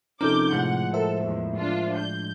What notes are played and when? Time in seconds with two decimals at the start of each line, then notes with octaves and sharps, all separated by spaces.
0.21 C3 F3 C#4 D#4 A4 A#4 D6 G6
0.52 A2 C3 F3 G#3 F#5
0.94 A4 A#4 C5 E5
1.25 E2
1.57 D4 F4
1.98 G6